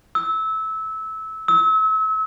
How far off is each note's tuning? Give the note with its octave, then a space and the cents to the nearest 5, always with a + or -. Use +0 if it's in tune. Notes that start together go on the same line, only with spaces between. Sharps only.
E6 -20
E6 -35